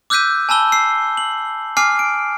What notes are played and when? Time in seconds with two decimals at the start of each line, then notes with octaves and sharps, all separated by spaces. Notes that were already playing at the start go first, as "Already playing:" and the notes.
0.10 D6 E6 F#6 G6 B6 D#7
0.49 G#5 A5 B5 E6 G7
0.72 E6 C7
1.17 F#7
1.77 G#5 D6 F6 C7
1.99 D7